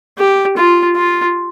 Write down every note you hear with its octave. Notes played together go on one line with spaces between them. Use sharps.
G4
F4
F4